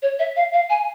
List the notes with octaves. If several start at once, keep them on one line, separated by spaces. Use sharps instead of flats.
C#5
E5
F5
F5
G#5